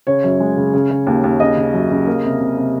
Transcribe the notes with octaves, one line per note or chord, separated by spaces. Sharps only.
C#3 C#5
F#2
G#3
C#3
C#3
C#3
D#2
D#2
C#3 D#5
C#3
F#2
C#3
A#3
C3
C3
C3